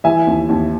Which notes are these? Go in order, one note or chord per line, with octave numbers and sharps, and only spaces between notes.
E3 E5 G#5
D#2
D#2